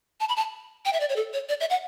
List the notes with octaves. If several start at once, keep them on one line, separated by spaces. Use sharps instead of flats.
A5
B5
A5
G5
E5
D5
C#5
A4
C#5
D5
E5
F#5